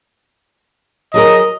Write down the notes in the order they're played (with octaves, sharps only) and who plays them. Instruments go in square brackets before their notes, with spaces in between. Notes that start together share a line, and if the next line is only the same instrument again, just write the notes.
[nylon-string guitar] F#3 G#4 A#4 [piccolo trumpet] D#5